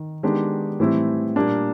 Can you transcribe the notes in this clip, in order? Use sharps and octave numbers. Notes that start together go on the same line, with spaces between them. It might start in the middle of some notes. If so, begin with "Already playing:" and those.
Already playing: D#3
D#3 G#3 B3 D4 G4
A2 E3 G3 C4 E4
A#2 G3 A#3 D4